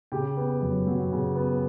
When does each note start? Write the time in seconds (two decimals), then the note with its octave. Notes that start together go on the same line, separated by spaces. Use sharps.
0.12 C#3 G4 G5
0.37 B3
0.62 F#2
0.87 F#3
1.12 C#3
1.36 B3